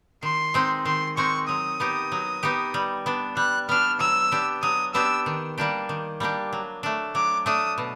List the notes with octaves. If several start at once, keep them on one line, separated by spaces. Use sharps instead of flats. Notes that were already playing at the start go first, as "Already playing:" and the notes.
D#3 C6
G#3 C4 D#4
D#3 C6
G#3 C4 D#4 C#6
F#3 D#6
B3 D#4 G4
F#3
B3 D#4 G4
G3
B3 D4
G3 F#6
B3 D4 F6
F#3 E6
B3 D4 G4
F#3 D#6
B3 D4 G4 E6
D#3
G3 A#3 D4 G4
D#3
G3 A#3 D4 G4
F#3
A3 D4
F#3 D6
A3 D4 D#6
B2